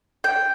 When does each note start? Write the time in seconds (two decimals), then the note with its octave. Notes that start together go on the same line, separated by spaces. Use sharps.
0.24 G5